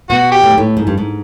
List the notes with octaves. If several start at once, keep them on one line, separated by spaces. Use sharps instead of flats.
B2 F#4
G4
A2
G#2
A2
G#2
G2
G#2